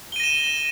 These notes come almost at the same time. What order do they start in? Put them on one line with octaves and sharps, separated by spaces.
G7 D#7 A#6 E7